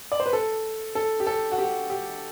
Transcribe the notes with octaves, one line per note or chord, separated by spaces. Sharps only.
D5
C5
B4
A4
A4
G4
A4
F#4
G4
G4